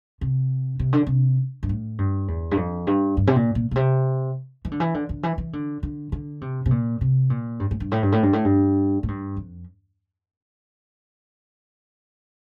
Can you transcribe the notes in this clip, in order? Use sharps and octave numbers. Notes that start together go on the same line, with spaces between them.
C3
C3
D3
C3
G2
A2
G2
E2
G2
F2
G2
G2
C3
A#2
A#2
A#2
C3
E3
D3
E3
D3
D3
E3
E3
D3
D3
D3
C3
C3
A#2
C3
A#2
G2
A2
G2
A2
G2
A2
G2
A2
G2
A2
G2
F2